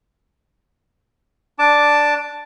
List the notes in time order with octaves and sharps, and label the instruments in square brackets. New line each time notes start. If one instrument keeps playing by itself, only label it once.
[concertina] D4 A5 D6